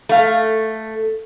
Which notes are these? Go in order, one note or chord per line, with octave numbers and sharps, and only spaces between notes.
A3 F5